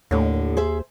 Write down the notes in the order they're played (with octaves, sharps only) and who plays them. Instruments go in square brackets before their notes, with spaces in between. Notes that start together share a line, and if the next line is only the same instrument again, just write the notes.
[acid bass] D#2 [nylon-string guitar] A2 D3
[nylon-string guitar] G#4 C5 E5